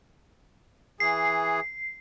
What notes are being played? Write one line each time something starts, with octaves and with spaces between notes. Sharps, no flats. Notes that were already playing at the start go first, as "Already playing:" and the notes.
E3 G#4 C7